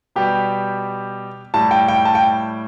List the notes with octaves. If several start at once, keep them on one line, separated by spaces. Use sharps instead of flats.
B2 G3 G4
A2 G3 A5
G5
G5
A5
G5